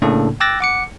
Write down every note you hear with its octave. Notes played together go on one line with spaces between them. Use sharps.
A2 C#3 A#3 D4 A4
G5 D6 E6 F#6 A6 A#6
F#5 D6 C#7